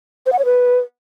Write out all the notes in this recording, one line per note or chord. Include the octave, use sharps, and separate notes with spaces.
C5
F#5
C#5
B4